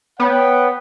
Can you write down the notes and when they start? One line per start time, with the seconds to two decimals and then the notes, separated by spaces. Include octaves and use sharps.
0.20 B3 C#5 F#5 G5